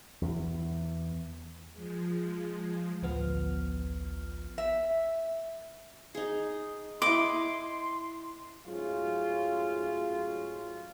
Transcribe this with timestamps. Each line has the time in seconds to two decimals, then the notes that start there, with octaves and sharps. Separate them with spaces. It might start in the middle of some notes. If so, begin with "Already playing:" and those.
0.21 E2 E3
1.73 F3 G#3
3.02 A1 D2 F3 B3 F6
4.58 E5
6.15 D#4 G#4
7.02 E4 D#5 C6 D6
8.67 G#2 F#3 A3 C#4 F4